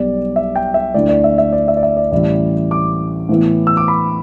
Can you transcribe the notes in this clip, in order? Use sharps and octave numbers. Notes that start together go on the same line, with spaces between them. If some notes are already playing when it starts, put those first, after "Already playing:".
Already playing: B1 B2 G3 D5
E5
G5
E5
D2 D3 A3 E4 D5
D5
E5
E5
D5
E5
D5
E5
D5
A1 A2 G3 E4 D5
D6
A2 E3 B3 E4
E6
D6
B5